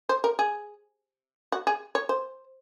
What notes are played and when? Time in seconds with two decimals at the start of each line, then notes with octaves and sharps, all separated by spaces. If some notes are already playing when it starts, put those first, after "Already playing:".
0.09 C5
0.24 A#4
0.39 G#4
1.52 F#4
1.67 G#4
1.95 C#5
2.09 C5